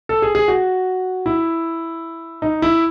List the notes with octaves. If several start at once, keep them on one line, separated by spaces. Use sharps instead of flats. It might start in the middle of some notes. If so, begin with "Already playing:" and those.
A4
G#4
G#4
F#4
E4
D#4
E4